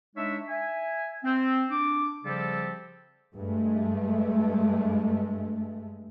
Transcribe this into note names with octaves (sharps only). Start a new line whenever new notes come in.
G#3 D4 D#4 C#5 E5
E5 G#5
C4
D4 D6
C#3 F3 G3 C4 G4 A4
G2 G#3 A3